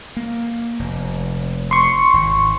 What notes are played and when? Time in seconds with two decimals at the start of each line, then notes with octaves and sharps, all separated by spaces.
0.17 A#3
0.79 F1
1.71 C6 C#6
2.14 G#1